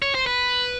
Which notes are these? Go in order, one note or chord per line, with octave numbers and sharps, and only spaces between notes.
C#5
C5
B4